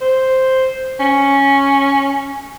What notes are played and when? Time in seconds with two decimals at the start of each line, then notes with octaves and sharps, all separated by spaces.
0.01 C5
1.00 C#4